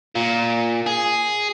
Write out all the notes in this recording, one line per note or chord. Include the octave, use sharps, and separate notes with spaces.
A#2
G#4